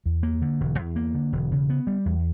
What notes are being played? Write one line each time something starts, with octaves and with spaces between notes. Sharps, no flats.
E2
A#3
D3
E1
E2
A#3
D3
E1
C#3
B3
G3
E2